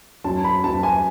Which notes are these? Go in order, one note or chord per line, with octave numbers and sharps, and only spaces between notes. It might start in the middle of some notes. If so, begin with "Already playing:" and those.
F#2 A5
B5
F#2 A5
G#5